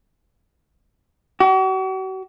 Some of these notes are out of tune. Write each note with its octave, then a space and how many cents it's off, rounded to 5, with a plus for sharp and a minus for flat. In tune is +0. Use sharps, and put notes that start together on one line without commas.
F#4 +40